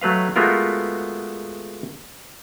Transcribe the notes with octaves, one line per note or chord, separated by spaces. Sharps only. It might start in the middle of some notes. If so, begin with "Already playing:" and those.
F#3 A3 B4 F5
G#3 A3 B3 F4 F#4 A#4